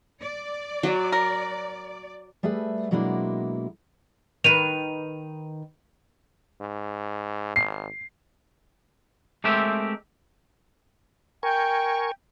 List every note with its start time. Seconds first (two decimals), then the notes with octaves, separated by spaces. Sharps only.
0.21 D5
0.83 F#3
1.12 A#4
2.43 G3 A3 G#4 B4 E5
2.91 B2 F#3 G#3 A#3 D4 E4
4.44 D#3 B4 D#7 F7
6.61 G#2
7.56 G#1 C7
9.44 G#3 A3 C4 G4 A#4 E5
11.43 A#4 G5 G#5 C#6